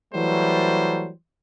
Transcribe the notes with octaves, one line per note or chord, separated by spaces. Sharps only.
E3 F#3 G3 A3 C5